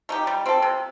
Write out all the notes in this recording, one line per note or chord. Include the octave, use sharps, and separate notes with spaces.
A3 D#4 G4
G3
C4 F4 A4
C3